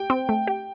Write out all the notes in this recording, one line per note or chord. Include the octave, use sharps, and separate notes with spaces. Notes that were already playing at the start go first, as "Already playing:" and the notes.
Already playing: G4 G5
C4
A3
G4